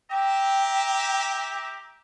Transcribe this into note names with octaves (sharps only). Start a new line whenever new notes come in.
G4 E5 G5 A#5